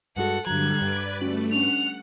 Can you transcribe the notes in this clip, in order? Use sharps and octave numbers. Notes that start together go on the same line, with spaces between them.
G2 G#3 F#4 A4 F#5
G2 D3 F#3 G3 A#5 F#6 G#6
G2 B4 D5
A3 C#4 F#4 F#7
C#4 D4 F#5 F7